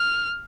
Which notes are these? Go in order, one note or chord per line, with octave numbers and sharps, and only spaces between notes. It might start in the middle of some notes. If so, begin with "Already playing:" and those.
Already playing: F6